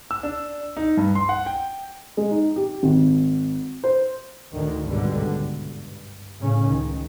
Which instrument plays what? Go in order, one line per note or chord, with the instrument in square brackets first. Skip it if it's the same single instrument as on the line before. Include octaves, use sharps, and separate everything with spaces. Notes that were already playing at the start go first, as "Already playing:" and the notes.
[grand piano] E6
D4
D#4
G2
C6
F#5
G5
G#3
D#4
G4
G#1
C5
[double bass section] D2 D3 D#3
G#1 C#2 B2 D3 G3
G2
A2 C#3 C#4
C#2 D#3